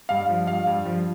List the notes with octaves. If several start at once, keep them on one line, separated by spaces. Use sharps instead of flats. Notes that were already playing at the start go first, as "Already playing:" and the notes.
G2 F5
F3
G2 F5
G2
F3